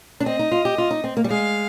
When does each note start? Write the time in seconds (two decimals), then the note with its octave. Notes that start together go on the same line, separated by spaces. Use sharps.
0.20 D4
0.26 C4 D#5
0.39 D#4
0.52 F4
0.65 G4
0.78 F4
0.91 D#4
1.04 C4
1.17 A#3
1.24 G3
1.30 G#3 F5